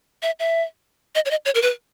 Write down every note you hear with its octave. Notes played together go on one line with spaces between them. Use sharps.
E5
E5
D#5
C#5
D#5
C#5
A#4
B4